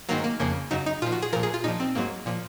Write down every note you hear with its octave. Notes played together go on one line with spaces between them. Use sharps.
G#2 D#3 F#3 A#3
A#3
F2 C#3 F3 A#3
F#2 C#3 F#3 D#4
D#4
A#2 F3 F4
F#4
G#4
A#2 F3 A#4
G#4
F4
A#2 F3 D#4
C4
G#2 F#3 A#3
A#2 F3